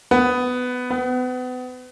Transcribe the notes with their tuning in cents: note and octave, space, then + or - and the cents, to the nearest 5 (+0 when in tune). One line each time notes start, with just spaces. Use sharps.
B3 +15
B3 +35